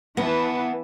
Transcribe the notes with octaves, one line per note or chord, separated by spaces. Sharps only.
E3 B3 B4 A5